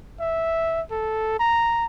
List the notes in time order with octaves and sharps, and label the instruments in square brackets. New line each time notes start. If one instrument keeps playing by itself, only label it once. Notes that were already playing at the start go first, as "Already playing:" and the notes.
[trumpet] E5
A4
A#5